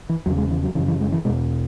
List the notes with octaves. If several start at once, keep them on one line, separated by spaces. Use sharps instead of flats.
E3
E2 C#3 F#3
G#3
E3
F#3
F#2 C#3 E3
E3
G#3
E3
E2 B2 G#3